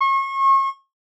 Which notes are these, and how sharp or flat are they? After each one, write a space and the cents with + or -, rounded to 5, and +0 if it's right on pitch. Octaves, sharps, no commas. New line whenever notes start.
C#6 -35